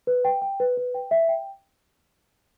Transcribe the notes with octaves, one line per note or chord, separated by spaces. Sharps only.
B4
G5
G5
B4
B4
G5
E5
G5